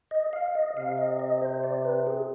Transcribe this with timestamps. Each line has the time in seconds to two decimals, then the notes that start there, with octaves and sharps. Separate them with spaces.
0.11 D#5
0.33 F5
0.55 D#5
0.76 C3 F5
0.98 D#5
1.19 D#5
1.41 C5
1.63 D5
1.85 B4
2.07 G#4